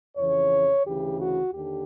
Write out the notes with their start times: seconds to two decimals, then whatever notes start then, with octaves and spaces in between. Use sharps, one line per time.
0.16 F2 C#3 E3 C#5
0.85 D2 C#3 E3 G4
1.20 F#4
1.54 D#2 D3 G4